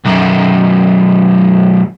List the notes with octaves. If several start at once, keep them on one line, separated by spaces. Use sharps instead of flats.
B1 F#2